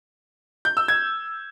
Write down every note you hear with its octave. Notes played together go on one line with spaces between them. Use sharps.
G6
E6
G#6